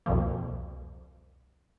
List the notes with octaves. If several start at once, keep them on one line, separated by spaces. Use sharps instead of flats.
C2 F2 B2 F3 A#3